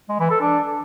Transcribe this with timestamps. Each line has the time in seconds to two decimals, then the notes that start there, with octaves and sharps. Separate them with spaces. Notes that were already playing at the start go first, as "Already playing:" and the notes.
0.09 G#3
0.20 E3
0.30 A4
0.41 D4